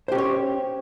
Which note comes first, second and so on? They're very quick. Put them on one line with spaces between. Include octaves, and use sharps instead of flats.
C5 G4 C#4 C#5